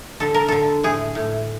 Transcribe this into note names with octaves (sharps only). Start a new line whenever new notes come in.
D3 A4
A#4
D3 A4
A2 G#4
A2